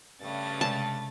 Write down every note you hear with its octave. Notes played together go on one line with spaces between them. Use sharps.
G2 C#3 A3 A6
C3 G#3 D5 A5